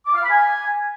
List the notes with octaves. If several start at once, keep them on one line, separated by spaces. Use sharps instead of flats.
D6
F5
B5
G#5